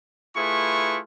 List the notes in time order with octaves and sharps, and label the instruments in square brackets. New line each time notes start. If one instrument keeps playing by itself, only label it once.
[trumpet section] A3 E4 F4 G#4 B4 C#6